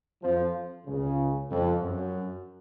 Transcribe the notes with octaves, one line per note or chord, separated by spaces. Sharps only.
F2 F3
C#2 C#3
F2
F#2